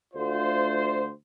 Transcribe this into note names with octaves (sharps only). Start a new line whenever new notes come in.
D2 F4 C5